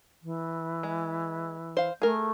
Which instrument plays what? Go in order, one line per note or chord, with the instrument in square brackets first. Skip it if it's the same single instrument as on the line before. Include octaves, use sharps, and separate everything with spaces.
[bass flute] E3
[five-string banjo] G#3
C5 F5
[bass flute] A3 [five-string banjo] G#4 A#4